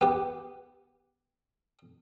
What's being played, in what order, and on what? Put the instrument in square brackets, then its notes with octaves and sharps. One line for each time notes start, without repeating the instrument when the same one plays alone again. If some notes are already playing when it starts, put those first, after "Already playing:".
[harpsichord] B3 G4